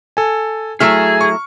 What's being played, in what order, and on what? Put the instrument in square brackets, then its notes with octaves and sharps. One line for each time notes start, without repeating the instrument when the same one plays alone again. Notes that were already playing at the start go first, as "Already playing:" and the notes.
[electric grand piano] A4 G#5
[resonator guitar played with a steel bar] F#3 A3 E4 [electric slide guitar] G#4 [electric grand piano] E6 F6
[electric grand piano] C#6